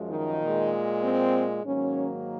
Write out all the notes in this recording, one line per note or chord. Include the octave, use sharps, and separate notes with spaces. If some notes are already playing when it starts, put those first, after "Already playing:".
Already playing: F#2 F3 G#3
D#3 D#4
A#2 G#3
C4
G#2 D#3 F#3 A#3 C#4